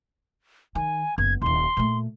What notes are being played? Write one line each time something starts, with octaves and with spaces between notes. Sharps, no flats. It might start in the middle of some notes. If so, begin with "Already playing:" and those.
D#3 G#5
F#1 B3 G#6
D#1 D#2 C6
A#2 A3